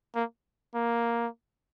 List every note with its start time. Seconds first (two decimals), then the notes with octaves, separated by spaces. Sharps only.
0.15 A#3
0.74 A#3